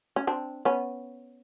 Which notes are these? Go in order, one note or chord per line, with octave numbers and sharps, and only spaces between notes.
C#4
C4 D4
B3 C#4